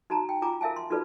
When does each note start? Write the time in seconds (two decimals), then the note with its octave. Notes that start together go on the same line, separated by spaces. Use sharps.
0.10 D#4 F#4 A5 A#5
0.29 G5
0.42 F4 G#5 A#5 D6
0.61 A#4 E5 F5 G#5 A5
0.76 C6
0.90 D#4 F4 F#4 A4 B4 D5